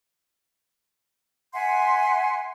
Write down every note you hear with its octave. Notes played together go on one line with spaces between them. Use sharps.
E5 F#5 G#5 C6